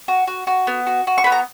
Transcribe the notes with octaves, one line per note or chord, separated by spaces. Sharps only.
F#4
F#4
F#4
B3
F#4
F#4
C#6
B3 B5
A#5